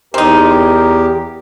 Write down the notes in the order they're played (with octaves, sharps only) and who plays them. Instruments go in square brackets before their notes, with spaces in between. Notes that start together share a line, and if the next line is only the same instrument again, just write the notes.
[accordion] E2 G4 [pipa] C4 D#4 [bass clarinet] A#4